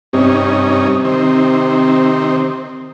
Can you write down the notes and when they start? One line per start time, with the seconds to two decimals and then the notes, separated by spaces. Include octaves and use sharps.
0.13 G2 C3 C#4 D#4
1.04 D#3 C4